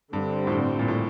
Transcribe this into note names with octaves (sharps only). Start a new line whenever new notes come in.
G2 D3 G3 C4
A2
G2
A#2
A2